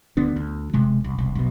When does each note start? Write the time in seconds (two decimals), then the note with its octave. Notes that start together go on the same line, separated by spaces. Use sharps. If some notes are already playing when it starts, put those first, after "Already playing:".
0.17 D2 D3 B3 D4
0.36 D2
0.73 E1 C3 G#3
1.04 C2
1.18 E1 C2
1.35 B1 B2